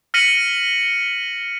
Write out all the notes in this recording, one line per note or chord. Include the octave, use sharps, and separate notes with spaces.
F6 A#6 B6 C#7 D#7 F#7